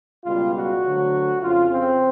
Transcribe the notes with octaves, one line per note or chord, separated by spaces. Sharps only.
C#2 B2 G3 F4
F#4
D2 D3 F#3
F2 C#3 F3 F4
C4